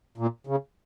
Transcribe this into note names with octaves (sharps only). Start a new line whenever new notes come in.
A#2
C#3